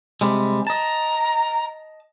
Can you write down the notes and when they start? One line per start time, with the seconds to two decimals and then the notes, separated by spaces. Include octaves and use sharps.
0.21 C3 G3 G#3
0.67 D#5 A5 A#5